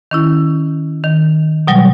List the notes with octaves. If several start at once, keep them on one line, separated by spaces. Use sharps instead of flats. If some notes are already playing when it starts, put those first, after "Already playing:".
D#3 C#4 E4
D#3
B2 F#3 G3